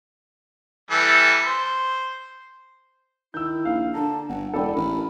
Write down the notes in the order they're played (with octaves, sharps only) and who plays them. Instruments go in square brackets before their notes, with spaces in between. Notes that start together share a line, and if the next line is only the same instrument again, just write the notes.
[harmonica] E3 G3 A4
C5
[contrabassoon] D#3 [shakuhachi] E4 [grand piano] E6 G6
[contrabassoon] A#1 [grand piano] F5
[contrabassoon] D3 [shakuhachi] A5 [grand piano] A#5
[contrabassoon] G1 [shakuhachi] F#5
[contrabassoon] E1 [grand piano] A4 D5 G5 [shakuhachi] B5
[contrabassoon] A1 [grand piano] A#4